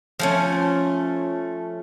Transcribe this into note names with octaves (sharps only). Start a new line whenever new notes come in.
F3 A3 C#4